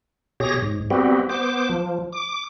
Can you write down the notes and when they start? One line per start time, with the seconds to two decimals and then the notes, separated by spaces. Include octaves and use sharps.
0.40 B2 G4 G#4 C#5 A#6
0.62 G#2
0.90 G3 B3 C4 F#4 G4
1.29 B3 C5 D6
1.69 F3
2.12 D6